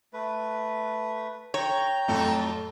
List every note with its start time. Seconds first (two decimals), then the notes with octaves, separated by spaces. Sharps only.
0.13 A3 B4
1.54 C#5 G5 A#5
2.08 F2 A2 F#3 F4 A4